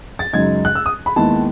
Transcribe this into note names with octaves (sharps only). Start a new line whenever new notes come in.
A6
F#2 C#3 G#3 D#4 G#6
F#6
E6
D#6
B5
D#2 D#3 G#3 B3 E4 A5